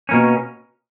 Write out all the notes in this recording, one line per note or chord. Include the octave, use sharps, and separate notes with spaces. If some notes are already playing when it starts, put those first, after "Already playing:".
B2 A#3 C#4